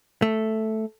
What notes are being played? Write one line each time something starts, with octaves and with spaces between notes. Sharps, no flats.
A3